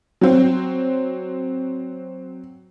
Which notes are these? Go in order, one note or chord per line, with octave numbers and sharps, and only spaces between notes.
F#3 C4